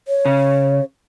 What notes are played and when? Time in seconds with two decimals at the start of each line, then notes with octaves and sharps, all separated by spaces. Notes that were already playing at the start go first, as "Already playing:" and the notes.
0.08 C#5
0.25 C#3